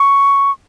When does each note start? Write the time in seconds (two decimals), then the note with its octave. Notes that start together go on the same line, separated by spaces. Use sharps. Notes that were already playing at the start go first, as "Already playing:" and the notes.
Already playing: C#6